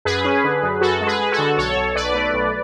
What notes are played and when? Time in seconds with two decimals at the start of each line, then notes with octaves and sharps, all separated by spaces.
0.05 F#2 G#4 B4
0.25 C#4
0.44 D3
0.63 F#2
0.81 F#2 F#4 A4
1.01 G#3
1.07 G#4 B4
1.19 G#3
1.32 F#4 A4
1.38 D3
1.57 B1 A4 C#5
1.76 B1
1.95 B1 B4 D5
2.15 A3
2.34 B1